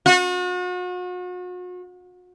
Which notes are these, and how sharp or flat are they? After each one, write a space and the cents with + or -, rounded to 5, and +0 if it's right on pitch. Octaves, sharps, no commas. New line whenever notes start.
F#4 -40